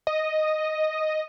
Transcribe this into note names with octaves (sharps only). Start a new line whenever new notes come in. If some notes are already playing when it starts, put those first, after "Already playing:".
D#5